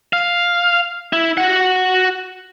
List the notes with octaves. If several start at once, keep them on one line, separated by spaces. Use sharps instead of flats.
F5
E4
F#4 F#5